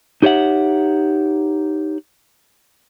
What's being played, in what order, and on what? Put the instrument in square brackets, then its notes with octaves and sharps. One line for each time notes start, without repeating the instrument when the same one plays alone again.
[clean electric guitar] D#4 G4 C#5 E5 F#5